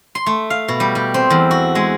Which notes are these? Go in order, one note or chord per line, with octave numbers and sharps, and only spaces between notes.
C6
A3
F5
B2
G3
G3
C4
E2
F#4
G#3